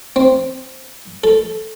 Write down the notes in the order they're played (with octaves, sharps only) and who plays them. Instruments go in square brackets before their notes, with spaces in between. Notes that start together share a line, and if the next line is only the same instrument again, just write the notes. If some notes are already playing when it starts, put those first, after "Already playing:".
[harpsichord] C4
A4